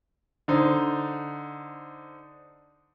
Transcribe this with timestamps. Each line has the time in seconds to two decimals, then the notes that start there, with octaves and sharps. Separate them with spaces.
0.48 D3 D#4 C5